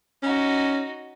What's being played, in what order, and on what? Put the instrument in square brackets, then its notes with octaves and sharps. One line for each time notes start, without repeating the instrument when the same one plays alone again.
[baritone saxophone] C#4 [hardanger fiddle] D#4 F#4